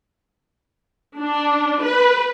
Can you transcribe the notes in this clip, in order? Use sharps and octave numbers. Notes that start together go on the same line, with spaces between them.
D4
B4